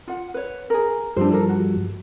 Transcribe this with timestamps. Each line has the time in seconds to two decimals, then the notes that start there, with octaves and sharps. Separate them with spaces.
0.07 F4 F#5
0.34 B4 C#5
0.70 G#4 A#4
1.17 G2 F3 G3 D4 E4 C5
1.30 E4 A4 A#4
1.49 F#4